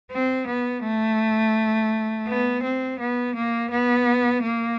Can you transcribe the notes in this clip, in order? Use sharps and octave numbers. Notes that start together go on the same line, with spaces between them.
C4
B3
A3
B3
C4
B3
A#3
B3
A#3